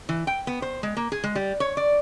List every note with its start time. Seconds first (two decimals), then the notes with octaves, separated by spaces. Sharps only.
0.09 E3
0.27 G5
0.47 B3
0.62 C5
0.83 G#3
0.97 A#3
1.12 G#4
1.24 G#3
1.35 G3
1.60 C#5
1.77 D5